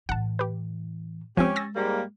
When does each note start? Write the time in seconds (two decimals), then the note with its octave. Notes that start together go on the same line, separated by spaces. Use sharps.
0.09 A2 E3 F#5 A5
0.39 G4 B4
1.37 F3 G#3 C4 C#4 G4
1.56 E6 A6 A#6
1.76 G#2 G3 A#3